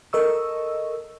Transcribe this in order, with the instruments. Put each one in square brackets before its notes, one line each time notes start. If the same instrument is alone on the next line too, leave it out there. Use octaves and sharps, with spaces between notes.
[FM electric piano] A4 A#4 D#5 C#6 E6